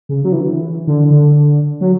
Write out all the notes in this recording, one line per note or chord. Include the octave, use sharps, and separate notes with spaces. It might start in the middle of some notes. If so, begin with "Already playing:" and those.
C#3
F#3
E3
D3
E3
D3
D3
F#3